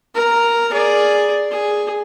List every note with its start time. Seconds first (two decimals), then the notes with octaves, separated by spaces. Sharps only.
0.15 A#4 A#5
0.73 G#4 D5
1.51 G#4